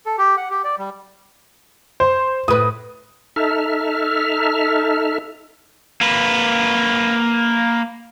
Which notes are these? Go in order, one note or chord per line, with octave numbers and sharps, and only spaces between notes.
A4
G4
F#5
G4
D5
G3
C5
A2 B4 D#6
D#4 A4 E5 F6
A#3 B4